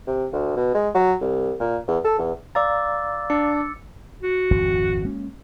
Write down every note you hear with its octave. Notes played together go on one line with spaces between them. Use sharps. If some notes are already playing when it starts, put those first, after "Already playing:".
C3
D2
B2
G#3
F#3
C2
A#2
E2
A4
E2
D5 F5 A#5 D6 E6 A6
D4 E6 C#7
F#4
D#1 G#1 F2
G#3 A#3 C#4